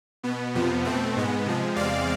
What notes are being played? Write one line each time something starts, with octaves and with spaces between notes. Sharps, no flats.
B2 B3
F2 C3 F3 B3
B2 A3 C4
G#2 G#3 B3
C3 F3 G#3
E2 C3 G#3 C4 D5 F5